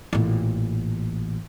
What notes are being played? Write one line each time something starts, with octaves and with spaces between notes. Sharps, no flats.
A1 A#2